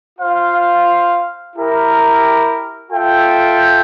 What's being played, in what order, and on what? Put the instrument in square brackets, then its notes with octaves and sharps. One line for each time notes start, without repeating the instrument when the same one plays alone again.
[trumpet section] F4 C5 F5
E4 G4 A#4
F4 A4 E5 G5